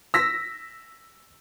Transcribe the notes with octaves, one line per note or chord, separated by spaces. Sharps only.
E6 A#6 B6